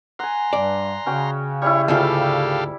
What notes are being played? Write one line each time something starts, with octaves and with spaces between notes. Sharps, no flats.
F#5 G#5 A#5 C6
G2 G3 D5
C#3 C#4 F#4 G5
G3 C#4 E4 C#5
D2 G#2 F4 G4 A4 D5 F5